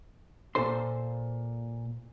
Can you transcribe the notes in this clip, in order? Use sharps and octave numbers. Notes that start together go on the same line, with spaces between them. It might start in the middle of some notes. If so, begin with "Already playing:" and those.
A#2 A4 C5 C6